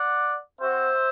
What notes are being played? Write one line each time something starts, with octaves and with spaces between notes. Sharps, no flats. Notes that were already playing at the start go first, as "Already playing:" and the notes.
Already playing: D5 F#5
C4 F#4 C5 E5